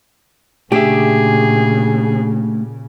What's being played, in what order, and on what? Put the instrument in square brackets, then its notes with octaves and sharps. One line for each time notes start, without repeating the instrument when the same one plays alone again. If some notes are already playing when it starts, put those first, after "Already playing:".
[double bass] A#2 C#3 [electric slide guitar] A3 D4 E5 [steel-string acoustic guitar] G4 [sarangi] G#4